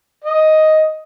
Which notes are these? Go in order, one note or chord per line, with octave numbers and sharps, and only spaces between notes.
D#5